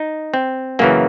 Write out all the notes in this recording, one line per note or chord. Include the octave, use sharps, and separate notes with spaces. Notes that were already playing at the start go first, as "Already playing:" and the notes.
Already playing: D#4
C4
F#2 C#3 E3 A#3